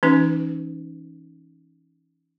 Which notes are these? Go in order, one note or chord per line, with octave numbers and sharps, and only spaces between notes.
E3 C#4 D#4 B4